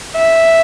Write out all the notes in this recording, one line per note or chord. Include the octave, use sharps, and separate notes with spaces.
E5